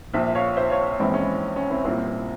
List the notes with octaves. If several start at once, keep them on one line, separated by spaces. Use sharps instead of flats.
A#1 A#2 C5 E5
C#5 F5
C5 E5
C#5 F5
A#1 G#2 E3 C4 E4
C#4
C#4
C4 E4
C2 A#2 C4 E4